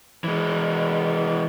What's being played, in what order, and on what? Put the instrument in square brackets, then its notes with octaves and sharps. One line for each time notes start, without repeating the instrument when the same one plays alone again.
[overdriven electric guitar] E3 G#3